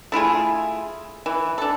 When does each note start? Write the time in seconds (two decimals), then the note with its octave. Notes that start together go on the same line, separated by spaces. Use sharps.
0.12 A3 E4 F4 G#4
1.26 E3
1.58 D4 A4